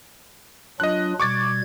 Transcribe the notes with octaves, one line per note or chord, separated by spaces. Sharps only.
F#3 D4 F4 D#5 F#6
B2 G3 C#6 D6 G#6 A6